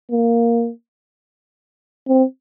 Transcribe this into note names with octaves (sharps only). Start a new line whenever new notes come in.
A#3
C4